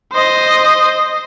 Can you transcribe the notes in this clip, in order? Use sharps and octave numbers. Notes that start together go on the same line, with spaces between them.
C5 D#5